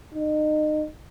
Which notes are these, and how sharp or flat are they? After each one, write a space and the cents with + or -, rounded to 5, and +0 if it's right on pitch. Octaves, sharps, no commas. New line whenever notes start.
D#4 -30